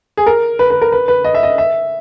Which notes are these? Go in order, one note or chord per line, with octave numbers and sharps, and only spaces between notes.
G#4
A#4
B4
B4
A#4
B4
B4
D#5
E5
D#5
E5